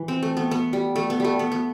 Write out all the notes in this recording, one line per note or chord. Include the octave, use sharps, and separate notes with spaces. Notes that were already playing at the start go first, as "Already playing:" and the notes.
Already playing: E3
C4
A3
B3
B3
G3
A3
B3
G3 A3
B3
B3